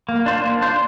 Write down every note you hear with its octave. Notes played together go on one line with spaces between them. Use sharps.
A#3
D4 F4 C5
A#3
D4 F4 C5